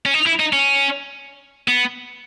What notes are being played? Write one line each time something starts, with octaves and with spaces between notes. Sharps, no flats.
C#4
D#4
E4
D#4
C#4
B3